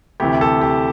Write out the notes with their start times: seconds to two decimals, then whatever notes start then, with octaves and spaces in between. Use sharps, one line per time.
0.20 D2 C3 E3 G4
0.41 A4
0.61 G4